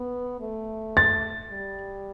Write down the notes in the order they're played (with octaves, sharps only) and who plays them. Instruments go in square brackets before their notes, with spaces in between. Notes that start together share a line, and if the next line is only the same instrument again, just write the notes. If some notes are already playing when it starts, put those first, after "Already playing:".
Already playing: [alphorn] B3
A3
[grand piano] A6
[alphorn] G3